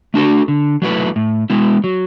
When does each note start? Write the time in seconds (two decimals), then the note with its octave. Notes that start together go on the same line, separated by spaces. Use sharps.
0.14 A3 D4 F#4 A4
0.48 D3
0.82 F#3 A3 E4 B4
1.16 A2
1.50 G#3 B3 E4
1.84 F#3